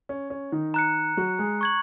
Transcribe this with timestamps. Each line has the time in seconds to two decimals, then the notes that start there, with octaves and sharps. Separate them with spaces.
0.09 C#4
0.30 C#4
0.52 D#3 D#4
0.74 A#5 F#6 C#7
1.17 F#3 F#4
1.39 G#3 G#4
1.61 C#6 G#6 F#7